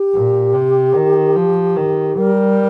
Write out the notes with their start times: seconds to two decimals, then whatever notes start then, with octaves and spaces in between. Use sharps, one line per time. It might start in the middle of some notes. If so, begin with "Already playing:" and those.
Already playing: G4
0.13 A#2
0.54 C3
0.95 D#3
1.36 F3
1.76 D#3
2.17 G3 A#4